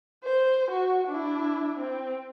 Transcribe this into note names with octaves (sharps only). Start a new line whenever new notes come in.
C5
F#4
D4 E4
C4